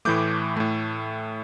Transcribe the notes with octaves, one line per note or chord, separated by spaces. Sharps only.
A2 E3 A3 D6 G6
A2 A3